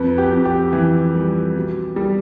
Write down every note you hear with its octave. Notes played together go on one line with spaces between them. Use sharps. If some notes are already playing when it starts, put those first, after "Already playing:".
Already playing: F2 B4
G4
F2
G4
E3
G3
B2
G3